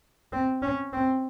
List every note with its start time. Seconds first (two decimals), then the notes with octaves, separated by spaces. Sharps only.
0.33 C4
0.62 C#4
0.93 C4